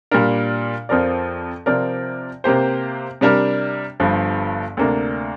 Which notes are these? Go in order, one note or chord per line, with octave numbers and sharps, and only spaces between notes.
A#2 G3 D4 A#4
F2 F3 C4 A#4 D5
C3 F3 C4 A#4 D5
C3 A#3 G4 C5
C3 G3 D4 A#4
G1 G2 F3
D2 C3 A#3 D4